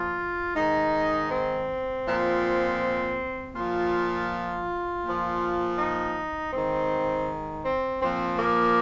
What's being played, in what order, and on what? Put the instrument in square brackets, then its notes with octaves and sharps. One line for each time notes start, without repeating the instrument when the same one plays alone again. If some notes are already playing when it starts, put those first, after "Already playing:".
Already playing: [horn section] A#2 F3 F4
G#2 D#3 D#4
C4
A#2 F3
A#2 F3 F4
A#2 F3
D#4
G#2 D#3 C4
C4
A#2 F3 C4
A#3